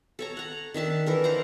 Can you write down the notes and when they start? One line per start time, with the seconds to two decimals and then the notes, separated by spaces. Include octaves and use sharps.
0.19 A4 C#5 A#5
0.37 F#5 A#5
0.74 D#3 D4 E5 A5
1.06 E3 A4 A#4
1.24 A#4 C5 F#5 A#5